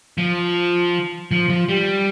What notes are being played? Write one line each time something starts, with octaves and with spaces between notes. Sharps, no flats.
F3
F3
F3
G3